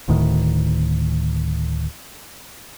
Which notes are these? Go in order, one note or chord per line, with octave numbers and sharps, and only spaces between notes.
D1 D2 A2 D#3